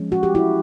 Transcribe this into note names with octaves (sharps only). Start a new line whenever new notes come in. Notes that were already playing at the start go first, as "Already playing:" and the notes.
Already playing: F3 G#3 C#4
F#4
G4
E4 F#4